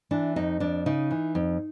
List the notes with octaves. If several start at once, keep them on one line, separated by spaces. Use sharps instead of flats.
E3 D4
F2 D#4
F2 D4
C#3 D#4
E3
F2